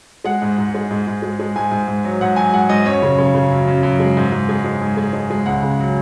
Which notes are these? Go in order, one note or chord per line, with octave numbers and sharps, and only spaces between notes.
G#3 F#5
G#2
G#2
G#3
G#2
G#2
G#3
G#3
G#2 G#5
G#2
G#2
F#3
G#2 F#5
F#3 G#5
G#2 F#5
G#2 D#5
F#2 C#5
C#3
C#3
C#3
F#2
F#2
F#2
G#3
G#2
G#2
G#3
G#3
G#2
G#3
G#3
G#3
C#2 F#5
C#3
F#3